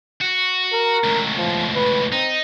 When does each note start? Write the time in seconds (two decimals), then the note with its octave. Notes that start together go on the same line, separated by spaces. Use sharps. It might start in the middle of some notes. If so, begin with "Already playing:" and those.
0.21 F#4
0.73 A#4
1.04 C#2 A2
1.38 F3
1.76 B4
2.12 C4 D#4